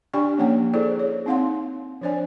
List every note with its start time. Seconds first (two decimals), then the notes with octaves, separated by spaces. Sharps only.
0.13 D4 G4 D5 G5 G#5 C#6
0.38 F3 A#3 C#4 C#5 F#5 G5
0.74 E4 G#4 A4 C5 D5
0.99 C#5
1.26 C4 D#4 F5 F#5 C6
2.01 F3 D4 C5 D5 G#5